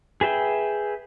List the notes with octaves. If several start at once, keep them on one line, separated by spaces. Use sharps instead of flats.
G#4 B4 E5 G5